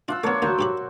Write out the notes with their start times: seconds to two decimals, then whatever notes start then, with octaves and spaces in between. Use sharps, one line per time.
0.08 D4 F4 F#5 E6
0.24 A3 B3 D4 A#4 C#5
0.42 D2 F#3 A#3 C5 C#6
0.59 G2 G4 B5